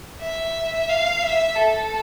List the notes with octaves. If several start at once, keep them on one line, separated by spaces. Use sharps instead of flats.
E5
F5
E5
A4